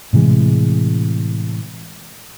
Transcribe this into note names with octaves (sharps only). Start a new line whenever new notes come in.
A2 C3 E3 G#3